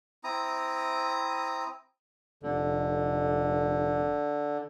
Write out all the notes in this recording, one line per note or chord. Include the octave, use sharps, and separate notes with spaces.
C4 E4 A#5 D#6
F1 D3